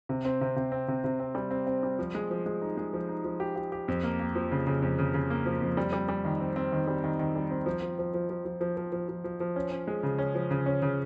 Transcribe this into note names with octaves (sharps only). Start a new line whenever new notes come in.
C3
C4
C3
C3
C4
C3
C3
C4
G3
C4
C4
G3
F3
G#3
F3
G#3
D#4
G#3
F3
D#4
F3
G4
G4
G4
F2
A#3
A#3
F3
C#3
C#3
F2
C#3
C#3
A#3
F3
F2
G3
G3
G3
D#3
C4
C4
D#3
G3
D#3
D#3
G3
C4
F3
F3
F3
F3
F3
F3
F3
F3
F3
F3
F3
F3
C#4
C#4
G#3
C#3
C#4
F3
C#3
C#4
C#3